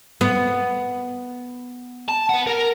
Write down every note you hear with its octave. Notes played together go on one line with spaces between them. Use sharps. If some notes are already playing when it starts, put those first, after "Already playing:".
B3
A5
B3 F#5
A#4